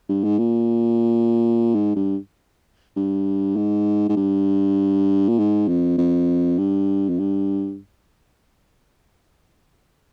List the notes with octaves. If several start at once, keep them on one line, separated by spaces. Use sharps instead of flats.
G2
G#2
A#2
G#2
G2
G2
G#2
G#2
G2
A#2
G#2
F2
F2
G2
F2
G2